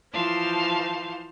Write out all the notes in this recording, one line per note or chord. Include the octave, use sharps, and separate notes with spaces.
E3 F3 C5 F5 A5